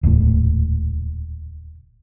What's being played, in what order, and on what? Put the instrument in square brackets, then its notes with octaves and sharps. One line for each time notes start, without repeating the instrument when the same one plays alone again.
[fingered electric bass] D#1 C#2 A2